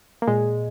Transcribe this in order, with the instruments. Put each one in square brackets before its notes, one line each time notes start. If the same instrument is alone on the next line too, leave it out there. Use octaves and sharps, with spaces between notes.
[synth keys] A#3
[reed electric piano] A#2 [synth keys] G#3